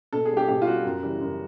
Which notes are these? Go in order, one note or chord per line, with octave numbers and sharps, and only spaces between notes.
B2 A4
G#4
G3
G4
B2 G4
F4
G3 F#4
F#2
C#3 E3 G3
F#2